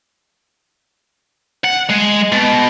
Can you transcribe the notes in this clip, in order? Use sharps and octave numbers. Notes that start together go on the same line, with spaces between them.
F#5
G#3
B2